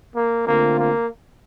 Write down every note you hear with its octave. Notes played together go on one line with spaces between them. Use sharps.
A#3
D3 A3 A#3 C4 F4
A#3